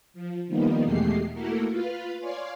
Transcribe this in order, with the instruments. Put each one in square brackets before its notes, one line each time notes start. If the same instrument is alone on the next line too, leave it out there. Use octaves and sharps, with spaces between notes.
[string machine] F3
D#3 F3 G3 A#3 B3 D#4
E2 B2 G#3 A3 G4 C7
A3 A#3 E4 F#4 A4 A#4
F4 B4 F5
C#5 D5 F5 G#5 C6